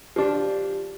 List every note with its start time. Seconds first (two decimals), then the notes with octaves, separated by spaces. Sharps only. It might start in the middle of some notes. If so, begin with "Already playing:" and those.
0.16 F3 D4 G4